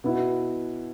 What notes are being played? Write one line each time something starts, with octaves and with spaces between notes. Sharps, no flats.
B2 B3 E4